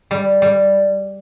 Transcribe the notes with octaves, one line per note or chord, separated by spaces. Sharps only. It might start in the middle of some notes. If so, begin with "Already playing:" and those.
G3
G3